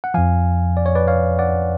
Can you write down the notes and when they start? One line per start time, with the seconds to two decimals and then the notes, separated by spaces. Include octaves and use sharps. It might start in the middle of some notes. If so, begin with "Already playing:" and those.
0.04 F#5
0.14 F2 F3 F5 G#5
0.77 D5
0.86 C#5
0.95 B4 D5
1.07 C#5 F5
1.39 D5 F#5